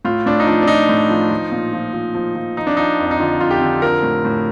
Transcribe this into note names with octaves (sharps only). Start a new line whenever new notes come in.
A2 F4
A2 D4
D#4
F3 D4
D4
F3 D#4
A2
F3
F3
A#2
F3
F3
F3
F3
F3 D#4
D4
F3 D#4
F2
D#4
D3 F4
F2 F4
G4
D3
F3 A#4
A2
A2